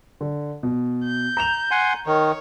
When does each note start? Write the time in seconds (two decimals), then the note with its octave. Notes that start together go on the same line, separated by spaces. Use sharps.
0.21 D3
0.63 B2
1.05 G6
1.37 A#5 E7 F7
1.71 F#5 G#5 C6
2.06 D#3 C#5